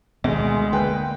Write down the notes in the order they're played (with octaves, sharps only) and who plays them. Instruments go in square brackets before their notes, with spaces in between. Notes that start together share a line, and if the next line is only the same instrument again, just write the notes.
[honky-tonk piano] D2 [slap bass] B2 D#3 G3 [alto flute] G#3 [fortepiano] D#5
[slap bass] D3 A#3 [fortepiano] B4 G5